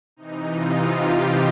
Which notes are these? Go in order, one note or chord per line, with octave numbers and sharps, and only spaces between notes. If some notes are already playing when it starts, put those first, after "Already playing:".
C3 E3 D#4
F4
G4